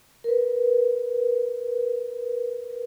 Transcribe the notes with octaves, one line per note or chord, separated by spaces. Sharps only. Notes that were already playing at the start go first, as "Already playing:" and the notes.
A#4 B4